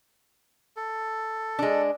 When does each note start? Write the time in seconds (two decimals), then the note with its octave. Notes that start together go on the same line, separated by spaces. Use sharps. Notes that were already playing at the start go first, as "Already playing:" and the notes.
0.76 A4
1.59 G#3 D4